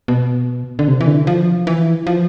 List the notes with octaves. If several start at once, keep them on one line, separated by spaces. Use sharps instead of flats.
B2
D3
C3
E3
D3
F3
E3
F3